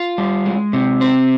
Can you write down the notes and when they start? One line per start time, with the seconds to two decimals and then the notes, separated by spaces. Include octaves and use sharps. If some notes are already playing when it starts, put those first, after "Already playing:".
Already playing: F4
0.18 G3
0.46 G#3
0.73 C3
1.01 C4